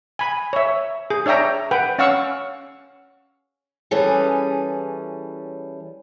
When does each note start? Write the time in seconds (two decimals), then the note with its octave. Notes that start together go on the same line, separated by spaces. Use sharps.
0.19 G#5 B5
0.53 C#5 E5
1.10 G#4
1.26 D4 C#5 E5 G5 A#5
1.71 B4 F#5 G5
1.98 C#4 F5 F#5 C#6 E6
3.91 E3 G3 C#4 G#4 A4 B4